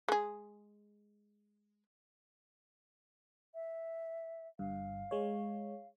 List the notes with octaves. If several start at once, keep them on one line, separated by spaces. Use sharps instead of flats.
G#3 G#4
E5
G1 G2 F5
G#3 C#5